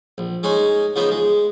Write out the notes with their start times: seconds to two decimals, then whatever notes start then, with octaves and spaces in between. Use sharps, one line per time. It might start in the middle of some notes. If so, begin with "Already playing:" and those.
0.18 A#1
0.43 G#3 C#4 D#4 G#5
0.96 C#3 F3 B3 D#4
1.11 G#3